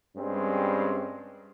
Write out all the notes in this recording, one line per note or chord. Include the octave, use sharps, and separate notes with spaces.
G2 G3 G#3 C4 C#4